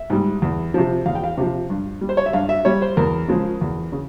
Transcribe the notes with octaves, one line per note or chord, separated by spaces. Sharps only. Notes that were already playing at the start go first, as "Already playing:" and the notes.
Already playing: E5
G#2 G3
E2
C3 F3
E2 F5
G5
F5
C3 F3
G2
G3
C5
C#5
E5
G2 F5
E5
G3 C#5
C5
E2 A#4
C#3 F3 G#3
E2
C#3